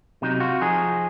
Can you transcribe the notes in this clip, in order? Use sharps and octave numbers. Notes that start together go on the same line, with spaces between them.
C3 F#3 D#4
F4 F#4
F3 D#4 G#4